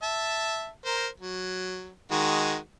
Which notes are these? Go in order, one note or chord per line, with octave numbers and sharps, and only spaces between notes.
E5 A5
A#4 C5
F#3
D#3 G#3 F#4